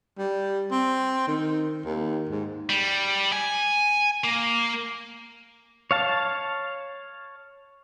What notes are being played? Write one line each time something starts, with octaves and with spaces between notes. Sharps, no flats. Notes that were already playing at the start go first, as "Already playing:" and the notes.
G3
C4
D#3
D#2
G#2
G3
G#5
A#3
C#5 F5 A5